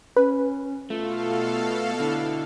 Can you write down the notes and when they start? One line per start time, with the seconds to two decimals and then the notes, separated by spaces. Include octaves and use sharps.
0.16 C#4 B4
0.90 B2 A3 F4 A4 F5
2.00 D3 E4